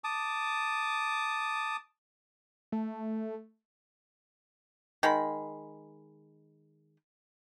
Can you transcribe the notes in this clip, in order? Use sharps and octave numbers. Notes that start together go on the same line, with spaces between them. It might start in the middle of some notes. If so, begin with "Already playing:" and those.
A5 D6 D#6
A3
D#3 G#3 B5